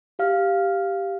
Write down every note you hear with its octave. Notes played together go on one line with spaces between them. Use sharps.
G4 F5 F6